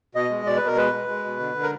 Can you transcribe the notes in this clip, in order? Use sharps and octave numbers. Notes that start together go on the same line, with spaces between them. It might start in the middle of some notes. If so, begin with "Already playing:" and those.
B2 D#5
G#3
B2 D5
B4
B2 A#4
G#3 B4
G#3
G#3
B2
D3
D3
A#4